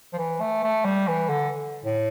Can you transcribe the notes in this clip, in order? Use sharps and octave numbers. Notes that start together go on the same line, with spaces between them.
F3
E3
A3
A3
G3
E3
D3
A2